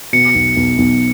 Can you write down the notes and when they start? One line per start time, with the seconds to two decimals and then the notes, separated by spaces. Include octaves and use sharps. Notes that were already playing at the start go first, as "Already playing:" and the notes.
0.13 B2 C#7
0.35 B1
0.56 B1
0.78 B1